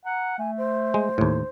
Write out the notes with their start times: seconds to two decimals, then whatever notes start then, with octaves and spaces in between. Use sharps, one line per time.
0.06 F#5 A#5
0.38 A3 G#5
0.58 C5
0.94 G#3
1.18 D#2 A2